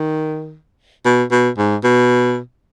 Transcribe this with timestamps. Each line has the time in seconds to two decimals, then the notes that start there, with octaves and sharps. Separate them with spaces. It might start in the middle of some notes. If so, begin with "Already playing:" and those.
Already playing: D#3
1.05 B2
1.31 B2
1.58 G#2
1.84 B2